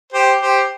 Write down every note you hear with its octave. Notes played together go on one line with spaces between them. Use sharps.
G4 C5
G4 C5